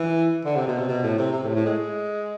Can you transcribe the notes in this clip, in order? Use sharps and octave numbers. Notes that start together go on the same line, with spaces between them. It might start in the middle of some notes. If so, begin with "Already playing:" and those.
Already playing: E3
D3
C3
B2
C3
B2
A2
C3
C3
A2
A2
G#3